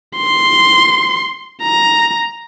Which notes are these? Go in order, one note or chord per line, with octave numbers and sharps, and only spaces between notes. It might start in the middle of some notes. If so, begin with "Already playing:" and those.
C6
A#5